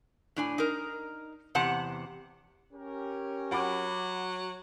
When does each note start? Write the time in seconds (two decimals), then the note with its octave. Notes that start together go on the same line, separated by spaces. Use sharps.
0.36 A2 D4 G#5
0.58 D#4 A#4
1.55 E2 C3 F#5 A5
2.73 C#4 G4 A#4
3.51 F#3 F#5 B5 D6